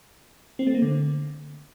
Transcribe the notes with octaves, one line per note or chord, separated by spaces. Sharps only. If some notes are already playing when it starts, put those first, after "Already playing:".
C4
A3
A#3
D3